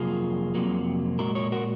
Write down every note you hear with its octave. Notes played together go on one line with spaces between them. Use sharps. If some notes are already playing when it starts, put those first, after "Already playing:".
Already playing: F2 C3 F#3 A#3 F4 G#4
F2 C3 F#3 A#3
A#2 G#3 F#4 A#4
A#4 C#5
F#4 A#4